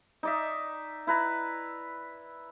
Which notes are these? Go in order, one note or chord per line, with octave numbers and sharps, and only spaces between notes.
D#4 D5 E5
E4 B4 A#5